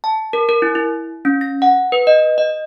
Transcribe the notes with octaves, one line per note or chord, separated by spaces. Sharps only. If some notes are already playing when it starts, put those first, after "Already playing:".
A5
A#4
A#4
E4
E4
C#4
A#6
F#5
B4
D#5
D#5